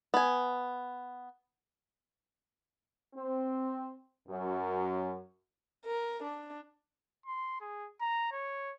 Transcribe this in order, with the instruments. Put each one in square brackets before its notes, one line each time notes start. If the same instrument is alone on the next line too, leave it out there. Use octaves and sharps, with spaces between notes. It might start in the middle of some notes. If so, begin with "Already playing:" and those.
[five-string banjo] B3 G#5
[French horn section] C4
F#2
[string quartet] A#4
D4
[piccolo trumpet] C6
G#4
A#5
C#5